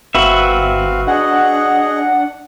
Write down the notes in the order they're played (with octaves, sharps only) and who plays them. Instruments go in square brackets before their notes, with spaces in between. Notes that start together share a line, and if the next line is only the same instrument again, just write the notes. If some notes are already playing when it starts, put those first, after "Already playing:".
[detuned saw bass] G1 [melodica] C4 F5 [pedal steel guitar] F#4 B4 E5
[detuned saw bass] D4 [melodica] G#4 D#5 [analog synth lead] F#5